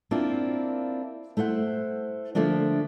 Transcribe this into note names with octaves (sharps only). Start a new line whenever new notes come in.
A#3 C4 D4 E4 F4 A#4
A3 E4 C5 F#5
D3 F3 A3 A#3 D4